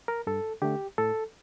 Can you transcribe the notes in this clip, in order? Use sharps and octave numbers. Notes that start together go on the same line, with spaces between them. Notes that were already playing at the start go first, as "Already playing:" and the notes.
A#4
G2 A4
D3 A3 G4
A2 A4